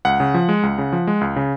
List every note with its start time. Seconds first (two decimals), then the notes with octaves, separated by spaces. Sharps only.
0.05 C#2 F#5
0.20 C#3
0.34 F3
0.49 G#3
0.63 C#2
0.78 C#3
0.93 F3
1.07 G#3
1.21 C#2
1.36 C#3